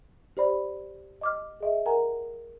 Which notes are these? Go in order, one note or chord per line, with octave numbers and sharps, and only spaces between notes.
G4 C5 D5 B5
D#5 D6 F6
G#4 D#5 E5
A#4 F#5 G#5 A#5